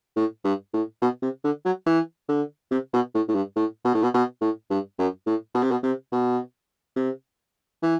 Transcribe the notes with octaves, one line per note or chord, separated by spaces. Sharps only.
A2
G2
A2
B2
C3
D3
F#3
E3
D3
C3
B2
A2
A2
G2
A2
B2
A2
B2
B2
A2
G2
F#2
A2
B2
C3
B2
C3
B2
C3
E3